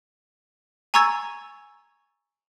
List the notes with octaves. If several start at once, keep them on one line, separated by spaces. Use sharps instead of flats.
G#5 A#5 C#6 E6 G#6 A6